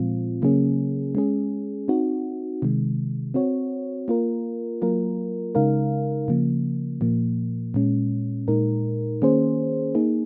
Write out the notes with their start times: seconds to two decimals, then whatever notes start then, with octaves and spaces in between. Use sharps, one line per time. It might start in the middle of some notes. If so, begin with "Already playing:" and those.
Already playing: A#2 F3 G#3 C4 F4
0.42 C#3 F#3 A#3 C#4 G#4
1.15 G#3 C#4 G#4
1.88 C4 D#4 F#4
2.62 C3 D#3 G#3
3.34 C4 F#4 C#5
4.08 A#3 F4 A#4
4.82 F#3 A#3 F4 A#4
5.55 C#3 G#3 D#4 A#4 F5
6.28 C#3 F3 A#3
7.01 A#2 F3 A#3
7.74 A#2 G#3 C#4
8.48 A#2 G#3 D#4 A#4
9.22 D#3 A#3 C#4 G#4 C5
9.95 A#3 D#4 G#4